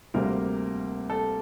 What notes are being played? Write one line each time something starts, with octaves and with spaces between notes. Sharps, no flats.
D2 C3 G3 A#3 A#4
A4